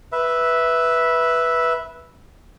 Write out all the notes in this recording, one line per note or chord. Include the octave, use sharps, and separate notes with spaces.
B4 E5